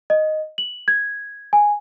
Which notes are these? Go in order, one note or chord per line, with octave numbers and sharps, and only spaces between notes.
D#5
F#7
G#6
G#5